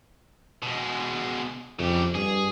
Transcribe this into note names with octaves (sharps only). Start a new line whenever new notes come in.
B2 G#3
F2 C#3 G4
G2 G#4